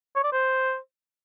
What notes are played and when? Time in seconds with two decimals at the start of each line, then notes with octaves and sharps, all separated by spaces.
0.16 C#5
0.24 D5
0.32 C5